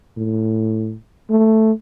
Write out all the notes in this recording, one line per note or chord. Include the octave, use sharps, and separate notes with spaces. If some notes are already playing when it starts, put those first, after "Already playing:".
A2
A3